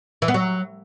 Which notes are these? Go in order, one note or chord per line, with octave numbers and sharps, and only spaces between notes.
E3
B3
F#3